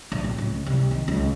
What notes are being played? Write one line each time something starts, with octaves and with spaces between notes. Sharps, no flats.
A#1
A2
C#2
C2
D#3
C#2